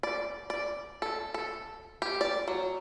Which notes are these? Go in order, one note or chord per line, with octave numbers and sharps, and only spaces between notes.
D5
D5
A4
A4
G4
D5
F#3